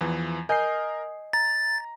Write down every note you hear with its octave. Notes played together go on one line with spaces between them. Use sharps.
E2 E3 F3
A#4 D#5 G#5 G6 C7
A#5 A6